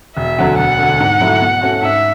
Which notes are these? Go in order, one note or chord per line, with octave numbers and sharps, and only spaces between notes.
E1 E5
D2 D3 F#3
E1 F#5
D2 D3
G#2
F#3 A3 E4
B2
A3 C#4 F#4
G#2 E5